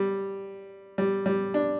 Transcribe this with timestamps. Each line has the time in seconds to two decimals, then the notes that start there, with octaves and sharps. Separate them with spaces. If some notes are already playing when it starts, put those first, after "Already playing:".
Already playing: G3
0.98 G3
1.26 G3
1.54 D4